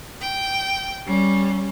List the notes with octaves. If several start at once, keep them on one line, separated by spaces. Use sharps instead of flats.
G5
G3 C#4